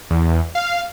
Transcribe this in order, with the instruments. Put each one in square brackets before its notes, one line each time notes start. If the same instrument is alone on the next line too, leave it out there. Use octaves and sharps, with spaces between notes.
[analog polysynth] E2
F5